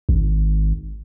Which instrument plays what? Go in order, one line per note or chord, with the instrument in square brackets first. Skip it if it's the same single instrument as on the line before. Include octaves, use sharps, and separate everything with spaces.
[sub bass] G#1